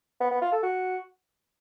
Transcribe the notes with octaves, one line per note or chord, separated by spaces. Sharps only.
B3
B3
F4
A4
F#4